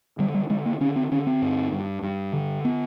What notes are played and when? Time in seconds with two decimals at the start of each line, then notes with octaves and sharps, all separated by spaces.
0.19 D3 G3
0.34 G3
0.49 D3 G#3
0.66 A#3
0.80 D3 C#4
0.96 C4
1.11 D3 C#4
1.27 C4
1.42 G2
1.73 G2
2.03 G2
2.33 D3
2.65 B3